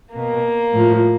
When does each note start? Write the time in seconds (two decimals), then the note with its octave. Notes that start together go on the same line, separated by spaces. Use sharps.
0.15 B2 A#3
0.72 A2 F3